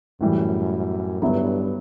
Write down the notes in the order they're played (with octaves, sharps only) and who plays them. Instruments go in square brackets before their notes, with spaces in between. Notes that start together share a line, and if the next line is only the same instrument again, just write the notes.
[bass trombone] F#2 [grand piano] A2 E3 G3
[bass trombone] G2 [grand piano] D3 F#3 B3 E4